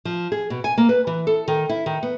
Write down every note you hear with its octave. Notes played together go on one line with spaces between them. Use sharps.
F3
G#4
B2
G#5
A#3
B4
E3
A4
D#3
E4
D#3
B3